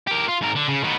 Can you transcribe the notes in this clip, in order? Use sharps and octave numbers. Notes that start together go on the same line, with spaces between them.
G4 A#4
F4
G#2 A#4
D3
C#3
D#3 B3